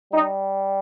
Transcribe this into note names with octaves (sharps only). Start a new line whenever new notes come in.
G3 D#4